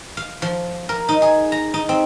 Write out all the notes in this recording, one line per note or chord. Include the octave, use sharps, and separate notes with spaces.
F5
F3
A#4
D#4
G#4
A#5
D#4
C4